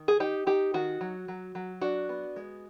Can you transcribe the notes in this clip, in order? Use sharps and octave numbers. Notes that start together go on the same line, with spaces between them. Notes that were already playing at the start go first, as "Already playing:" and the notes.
Already playing: D#3
G#4
D#4 G4
D#4 G4
D#3 F#4
F#3
F#3
F#3
D4 F#4
B3
G#3